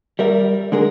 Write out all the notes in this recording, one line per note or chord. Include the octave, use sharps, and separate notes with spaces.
G3 A#4 E5
D3 G#3 G#4 A#4